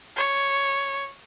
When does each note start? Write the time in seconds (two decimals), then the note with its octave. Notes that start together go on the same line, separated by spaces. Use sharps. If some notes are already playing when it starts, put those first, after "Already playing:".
0.17 C#5